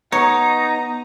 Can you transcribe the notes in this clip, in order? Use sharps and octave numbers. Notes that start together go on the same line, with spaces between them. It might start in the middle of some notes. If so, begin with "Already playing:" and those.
B3 D#4 C#5 A#5